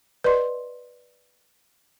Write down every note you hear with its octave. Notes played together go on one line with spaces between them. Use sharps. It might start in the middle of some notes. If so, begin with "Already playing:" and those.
B4 D5 D#5 C6